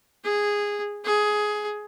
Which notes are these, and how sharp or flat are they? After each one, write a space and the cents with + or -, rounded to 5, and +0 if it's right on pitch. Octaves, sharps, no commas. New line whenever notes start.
G#4 -10
G#4 +15